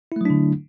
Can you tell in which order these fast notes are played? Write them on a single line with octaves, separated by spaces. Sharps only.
E4 A3 F#3 D4 D3